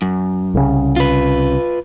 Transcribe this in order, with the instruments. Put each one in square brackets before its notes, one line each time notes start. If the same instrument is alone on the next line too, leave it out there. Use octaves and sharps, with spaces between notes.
[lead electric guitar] F#2
[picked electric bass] C2 C#3
[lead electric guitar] F4 B4